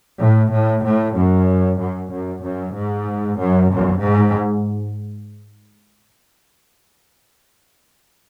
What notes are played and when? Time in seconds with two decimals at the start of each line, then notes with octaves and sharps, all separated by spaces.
0.20 A2
0.52 A2
0.84 A2
1.16 F#2
1.80 F#2
2.12 F#2
2.44 F#2
2.75 G#2
3.39 F#2
3.71 F#2
4.01 G#2